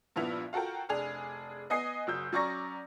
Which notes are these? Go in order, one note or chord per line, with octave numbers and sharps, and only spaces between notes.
G2 A#2 F3 B3 E4 F7
F4 F#4 A4 A#4 G5
F1 D4 G#4 F7
B3 D#5 G#5 D#6 C7
F#1 F#3 E6 G6
F#3 C#4 D5 A#5 C#6 A#6